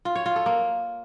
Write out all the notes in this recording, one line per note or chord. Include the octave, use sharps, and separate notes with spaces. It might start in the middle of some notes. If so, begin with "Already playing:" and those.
F4
C#5
F4
A4
A#3